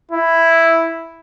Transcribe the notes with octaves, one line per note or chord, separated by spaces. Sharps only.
E4